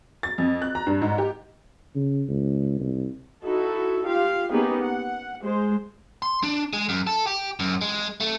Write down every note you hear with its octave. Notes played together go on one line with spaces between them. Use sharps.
A6
F2
F#6
A#5
G2
G#2
G4
C#3
C#2
C2
D#4 E4 F#4 A4
F4 G4 F5
A#3 B3 C#4 D#4 G4 G#4
F#5
G#3 C5
C6
D4
G#3
F#2
A4
G4
F#2
G#3
A3